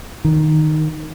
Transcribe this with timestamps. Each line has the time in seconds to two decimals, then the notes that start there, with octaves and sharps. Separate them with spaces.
0.25 D#3